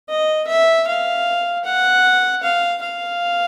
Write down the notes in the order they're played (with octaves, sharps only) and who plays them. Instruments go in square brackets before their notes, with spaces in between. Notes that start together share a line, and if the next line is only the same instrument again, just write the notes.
[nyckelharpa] D#5
E5
F5
F#5
F5
F5